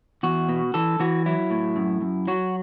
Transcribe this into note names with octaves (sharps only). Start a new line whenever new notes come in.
E2 F#4
B2
E3 A4
E3 F#4
F#3 E4
A2
F#2
F#2
F#3 F#4